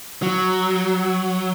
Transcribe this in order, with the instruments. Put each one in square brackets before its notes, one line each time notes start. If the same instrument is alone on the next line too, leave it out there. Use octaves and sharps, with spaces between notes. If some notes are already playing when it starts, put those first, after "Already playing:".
[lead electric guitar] F#3